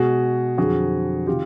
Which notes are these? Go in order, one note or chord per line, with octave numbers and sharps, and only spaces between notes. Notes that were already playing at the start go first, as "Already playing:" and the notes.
Already playing: B2 G#3 F#4 G#4
F2 D3 F#3 F#4 G#4
C3 D#3 F4 G4